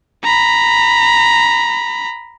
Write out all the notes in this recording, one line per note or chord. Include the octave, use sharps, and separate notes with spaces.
A#5 B5